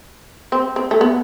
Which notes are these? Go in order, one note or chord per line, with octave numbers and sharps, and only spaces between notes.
C4
C4
A3
B3